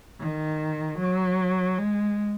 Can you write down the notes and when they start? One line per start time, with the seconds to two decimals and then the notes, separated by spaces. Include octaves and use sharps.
0.20 D#3
0.99 F#3
1.79 G#3